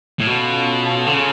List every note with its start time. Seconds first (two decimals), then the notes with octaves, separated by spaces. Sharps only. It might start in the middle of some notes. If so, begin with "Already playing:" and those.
0.19 A2
0.27 B2 C#4 F4 A4
1.06 D3
1.14 C#3